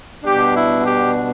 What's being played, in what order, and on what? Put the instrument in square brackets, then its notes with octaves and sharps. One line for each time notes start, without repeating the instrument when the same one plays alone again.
[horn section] B2 G3 B3 D4 G4
E4
G4